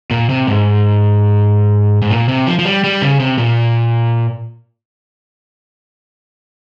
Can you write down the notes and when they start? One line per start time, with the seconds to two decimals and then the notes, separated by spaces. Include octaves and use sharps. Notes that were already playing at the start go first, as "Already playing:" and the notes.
0.11 A#2
0.29 C3
0.47 G#2
2.02 G#2
2.11 A#2
2.29 C3
2.47 F3
2.59 F3
2.65 G3
2.84 G3
3.02 C#3
3.20 C3
3.38 A#2